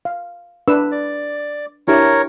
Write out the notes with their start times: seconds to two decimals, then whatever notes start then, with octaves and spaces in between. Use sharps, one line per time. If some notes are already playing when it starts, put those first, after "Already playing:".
0.05 F5
0.68 D4 B4 E6
0.92 D5
1.88 D4 E4 G4 A#4 C#5